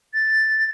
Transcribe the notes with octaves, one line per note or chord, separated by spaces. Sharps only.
A6